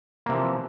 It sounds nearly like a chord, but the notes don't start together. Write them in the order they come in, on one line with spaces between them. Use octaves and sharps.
A#3 C3 E3 F3